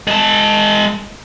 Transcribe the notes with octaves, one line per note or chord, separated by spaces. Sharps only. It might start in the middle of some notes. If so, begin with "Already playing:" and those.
G#3 A5